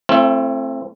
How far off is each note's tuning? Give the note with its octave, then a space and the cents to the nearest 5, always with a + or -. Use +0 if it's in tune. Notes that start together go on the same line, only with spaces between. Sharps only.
A3 +0 C4 +15 E4 +45